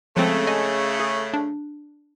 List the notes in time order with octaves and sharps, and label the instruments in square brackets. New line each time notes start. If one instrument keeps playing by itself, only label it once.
[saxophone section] C#3 A3 [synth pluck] F3 G#3 C4
[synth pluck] D#5 G#5
G#4
D4